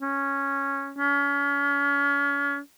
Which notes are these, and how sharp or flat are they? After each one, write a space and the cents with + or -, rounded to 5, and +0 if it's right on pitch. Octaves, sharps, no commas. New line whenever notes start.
C#4 -5
C#4 +35